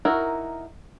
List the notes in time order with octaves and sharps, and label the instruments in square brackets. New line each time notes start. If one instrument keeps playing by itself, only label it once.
[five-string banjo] D#4 E4 F#4 A#4